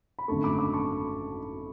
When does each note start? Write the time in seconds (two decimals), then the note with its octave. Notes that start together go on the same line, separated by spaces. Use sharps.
0.19 B5
0.28 G#1 F#2 D3 A3 A5 C#6
0.44 B5 D6
0.59 B5 D6
0.74 A5 C#6